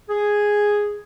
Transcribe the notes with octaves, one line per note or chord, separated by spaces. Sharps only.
G#4